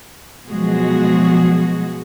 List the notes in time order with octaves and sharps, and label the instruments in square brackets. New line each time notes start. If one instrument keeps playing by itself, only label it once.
[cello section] B2 F3 F#3 G#3 F#4 G#4